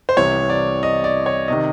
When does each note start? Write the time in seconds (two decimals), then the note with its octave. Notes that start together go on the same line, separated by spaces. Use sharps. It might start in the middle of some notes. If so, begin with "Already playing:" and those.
0.09 C5
0.17 C2 C3 E3 C#5
0.50 D5
0.83 D#5
1.04 D5
1.26 C#5
1.48 C3 D#3 D#5